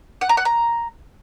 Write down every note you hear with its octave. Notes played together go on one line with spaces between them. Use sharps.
F#5
A#5
F#5
A#5